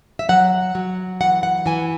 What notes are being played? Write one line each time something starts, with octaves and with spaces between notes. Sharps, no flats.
E5
F#3 F#5
F#3
E3 F#5
F#5
E3 G#5